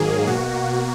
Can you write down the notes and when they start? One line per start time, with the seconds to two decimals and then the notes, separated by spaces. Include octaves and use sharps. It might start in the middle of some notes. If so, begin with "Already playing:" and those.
Already playing: G#2 D#3 F#3 A#3 G#4
0.27 B2 A#3 F#4